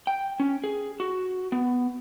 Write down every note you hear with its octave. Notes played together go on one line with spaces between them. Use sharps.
G5
C#4
G#4
F#4
B3